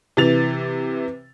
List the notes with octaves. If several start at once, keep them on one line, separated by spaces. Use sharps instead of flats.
C3 E3 A6 F7